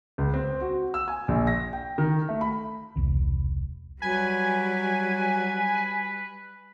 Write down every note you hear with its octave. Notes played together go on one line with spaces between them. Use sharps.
C#2
C4
F#4
E6
G#5
A#1
A#6
G5
D#3
A3
B5
E1 C2 C3
F#3 G3 B4 G#5